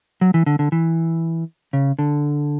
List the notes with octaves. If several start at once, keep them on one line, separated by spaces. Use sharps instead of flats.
F#3
E3
D3
D3
E3
C#3
D3